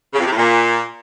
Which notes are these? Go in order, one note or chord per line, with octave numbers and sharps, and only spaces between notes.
C#3
F2
C3
A2
A#2